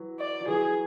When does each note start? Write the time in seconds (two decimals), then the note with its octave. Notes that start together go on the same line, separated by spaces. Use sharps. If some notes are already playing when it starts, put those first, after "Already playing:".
Already playing: E3 F#3
0.20 D5
0.41 F3
0.47 E3 F#3 G#4